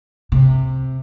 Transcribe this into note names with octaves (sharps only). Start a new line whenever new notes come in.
C3